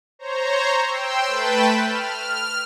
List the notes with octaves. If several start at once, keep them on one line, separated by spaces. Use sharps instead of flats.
C5 C#5 A#5
G5 C6 E6
A3 B4 G5 A5 B5 E7
F6